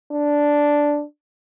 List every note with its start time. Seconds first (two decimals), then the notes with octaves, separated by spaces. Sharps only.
0.12 D4